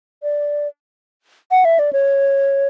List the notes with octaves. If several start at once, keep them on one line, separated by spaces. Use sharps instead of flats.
D5
F#5
E5
D5
C#5